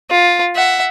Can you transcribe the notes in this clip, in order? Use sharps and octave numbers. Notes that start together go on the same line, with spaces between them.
F4
E5 F#5